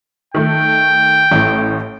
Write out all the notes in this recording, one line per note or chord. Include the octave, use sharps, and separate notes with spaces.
D#3 A3 G5
A1 A2